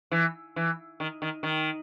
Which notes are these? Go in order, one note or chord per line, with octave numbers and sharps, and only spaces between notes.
E3
E3
D#3
D#3
D#3